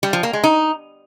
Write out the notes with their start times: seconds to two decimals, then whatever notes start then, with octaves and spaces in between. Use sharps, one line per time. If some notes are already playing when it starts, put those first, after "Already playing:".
0.03 G3
0.13 F3
0.23 A#3
0.33 G#3
0.44 D#4